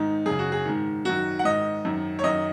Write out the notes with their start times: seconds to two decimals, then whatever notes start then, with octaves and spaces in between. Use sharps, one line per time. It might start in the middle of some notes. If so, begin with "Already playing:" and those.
Already playing: G#2 D#3 D#4
0.26 F#2 C#3 G#4
0.39 F#4
0.52 G#4
0.65 G#2 D#3
1.05 F#2 D#3 F#4
1.39 F#5
1.45 G#2 D#3 D#5
1.85 F#2 D#3
2.19 C#5
2.24 F#2 D#3 D#5